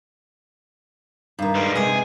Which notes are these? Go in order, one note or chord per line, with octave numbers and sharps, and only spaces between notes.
G2 D#3
G3 G#3 B4
C3 G#3 G#4